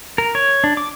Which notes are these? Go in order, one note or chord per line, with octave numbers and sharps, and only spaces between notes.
A#4
C#5
D4
D6